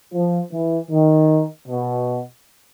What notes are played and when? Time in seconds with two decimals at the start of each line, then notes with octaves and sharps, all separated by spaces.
0.14 F3
0.52 E3
0.91 D#3
1.68 B2